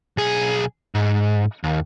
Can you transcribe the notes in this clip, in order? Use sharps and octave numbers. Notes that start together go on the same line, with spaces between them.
B1 G#4
G#2
D#2